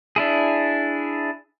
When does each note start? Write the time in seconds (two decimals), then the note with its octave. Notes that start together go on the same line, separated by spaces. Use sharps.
0.16 D4 E4 G#4